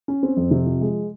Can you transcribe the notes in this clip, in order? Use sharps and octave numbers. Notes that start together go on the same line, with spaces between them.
C#4
C4
F2
C3
F3
G#3